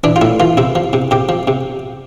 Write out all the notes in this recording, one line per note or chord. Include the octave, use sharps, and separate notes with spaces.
E3 D4
F4
A2 E4
E3 F4
C3 E4
F3
C3
C3 G4
F3
C3